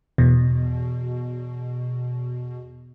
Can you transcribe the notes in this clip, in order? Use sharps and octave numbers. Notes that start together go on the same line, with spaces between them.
E2 B2